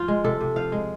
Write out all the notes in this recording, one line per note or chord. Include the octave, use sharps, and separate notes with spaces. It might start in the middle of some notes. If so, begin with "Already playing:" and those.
Already playing: F3 F4
G#3
C3 A4
C3
F3 F5
G#3